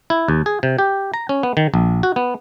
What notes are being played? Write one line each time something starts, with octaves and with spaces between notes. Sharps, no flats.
E4
D#2
G#4
C3
G4
A#5
C#4
B3
D#3
A#1
F#4
B3